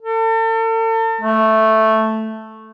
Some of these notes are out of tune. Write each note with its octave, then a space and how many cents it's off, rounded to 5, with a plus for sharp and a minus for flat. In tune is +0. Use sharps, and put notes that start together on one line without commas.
A4 +40
A3 +0